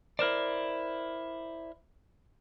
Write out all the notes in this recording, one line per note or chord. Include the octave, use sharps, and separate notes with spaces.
E4 A#4 C5 D5